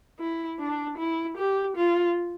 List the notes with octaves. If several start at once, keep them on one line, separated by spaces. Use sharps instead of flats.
E4
D4
E4
G4
F4